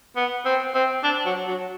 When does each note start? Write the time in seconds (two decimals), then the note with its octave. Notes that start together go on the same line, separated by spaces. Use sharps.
0.16 B3
0.45 C4
0.74 C4
1.04 D4
1.26 F#3
1.48 F#3